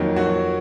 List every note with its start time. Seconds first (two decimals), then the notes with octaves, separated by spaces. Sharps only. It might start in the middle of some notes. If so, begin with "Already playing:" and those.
Already playing: F2 D#3 F#3 A#3
0.16 F#3 F#4